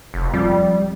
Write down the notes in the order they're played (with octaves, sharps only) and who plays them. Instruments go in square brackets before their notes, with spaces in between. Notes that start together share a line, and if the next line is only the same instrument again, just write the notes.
[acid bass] F1
[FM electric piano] F2 [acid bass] G3